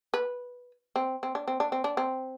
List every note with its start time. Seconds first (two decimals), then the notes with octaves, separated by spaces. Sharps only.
0.14 B4
0.96 C4
1.23 C4
1.35 D4
1.48 C4
1.60 D4
1.72 C4
1.84 D4
1.97 C4